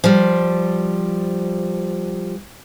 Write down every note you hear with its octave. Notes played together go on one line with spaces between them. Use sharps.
F3 G3